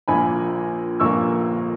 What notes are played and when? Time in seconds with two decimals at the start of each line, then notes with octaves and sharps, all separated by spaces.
0.08 A#1 A#2 A#3 G#5 B5
1.00 A#1 A#2 A#3 C#6 E6